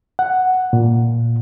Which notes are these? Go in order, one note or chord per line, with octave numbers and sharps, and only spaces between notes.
F#5
A#2